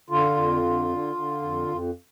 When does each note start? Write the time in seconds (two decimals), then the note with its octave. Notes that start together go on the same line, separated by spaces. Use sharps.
0.10 D3 F4
0.36 F2
0.62 D3
0.89 D3
1.15 D3
1.42 F2
1.68 F2